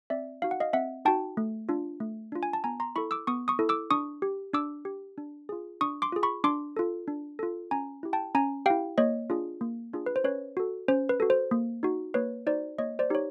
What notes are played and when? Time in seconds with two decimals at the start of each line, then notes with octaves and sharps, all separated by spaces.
0.10 C4 D5 E5
0.42 D#4 F#4 F5
0.51 F#5
0.60 D#5 F5
0.73 C4 E5 F#5
1.05 D#4 F#4 G5 A5
1.37 A3
1.69 D4 F4
2.00 A3
2.32 D4 F4
2.43 G#5
2.53 A5
2.64 B3 G#5 A#5
2.80 A#5 C6
2.96 E4 A4 B5 C#6
3.11 D6 E6
3.27 B3 C#6 D#6
3.48 C#6 D#6
3.59 E4 A4
3.69 D6 E6
3.90 D4 C#6 D#6
4.22 G4
4.53 D4 D6 E6
4.85 G4
5.18 D4
5.49 F4 G#4
5.81 D4 C#6 D#6
6.02 C6 D6
6.12 F4 G#4
6.23 B5 C#6
6.44 D4 C6 D6
6.77 F4 A4
7.08 D4
7.39 F4 A4
7.71 C#4 G#5 A#5
8.03 E4 G4
8.13 G5 A5
8.35 C#4 G#5 A#5
8.66 E4 G4 F5 G5
8.98 A#3 C#5 D#5
9.30 D4 F4 G#4
9.61 A#3
9.93 D4 F4 G#4
10.06 B4
10.16 C5
10.24 C#4 B4 C#5
10.57 F#4 A4
10.88 C#4 C5
11.09 B4
11.20 F#4 A4
11.30 C5
11.51 A#3
11.83 D#4 F#4
12.14 A#3 B4 C#5
12.47 D#4 F#4 C5 D5
12.79 A#3 C#5 D#5
12.99 C5 D5
13.10 D#4 G4 C#5